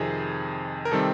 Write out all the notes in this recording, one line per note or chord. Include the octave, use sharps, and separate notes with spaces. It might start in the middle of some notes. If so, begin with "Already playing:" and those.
Already playing: F2 C3 D#3 G#4
A#4
C3 D#3 G3 C4 A4